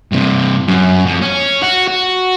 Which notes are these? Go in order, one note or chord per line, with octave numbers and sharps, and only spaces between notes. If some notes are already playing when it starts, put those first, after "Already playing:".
G2 C3
F#2
F2
C#4
F#4
F#4